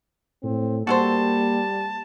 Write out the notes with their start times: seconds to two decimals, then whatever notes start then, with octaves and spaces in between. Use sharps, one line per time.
0.43 A2 C4
0.87 G3 A#3 F#4 A4 C5 A5